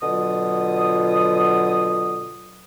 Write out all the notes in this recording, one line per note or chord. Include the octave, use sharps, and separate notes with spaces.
B2 D3 F#3 F4 D#6